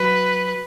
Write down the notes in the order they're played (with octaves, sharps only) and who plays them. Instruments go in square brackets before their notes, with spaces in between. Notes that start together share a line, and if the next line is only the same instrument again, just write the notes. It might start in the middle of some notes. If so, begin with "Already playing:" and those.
Already playing: [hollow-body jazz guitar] F#3 [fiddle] B4